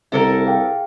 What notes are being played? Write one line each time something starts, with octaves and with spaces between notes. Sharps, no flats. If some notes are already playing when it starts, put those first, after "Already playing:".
C2 E4 A4 A#4
G#4 F5 G5